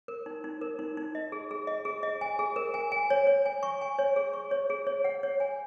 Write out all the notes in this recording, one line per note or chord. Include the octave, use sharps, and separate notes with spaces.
A#4
D#4
D#4
A#4
D#4
D#4
D#5
G#4
G#4
D#5
G#4
D#5
G#5
G#4
A#4
G#5
G#5
C#5
C#5
G#5
C#6
G#5
C#5
G#4
C#6
C#5
G#4
C#5
F#5
C#5
G#5